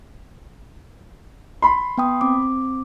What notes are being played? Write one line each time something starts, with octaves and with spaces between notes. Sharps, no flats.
B5 C6
B3 G5 D#6
C4 D6